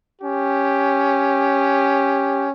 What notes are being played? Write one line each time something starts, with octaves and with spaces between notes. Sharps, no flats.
C#4 G4